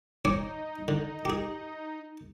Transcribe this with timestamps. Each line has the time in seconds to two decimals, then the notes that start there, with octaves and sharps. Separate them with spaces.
0.25 D#4 C#5 G#5 D6
0.88 D3 D#4
1.25 G4 G#4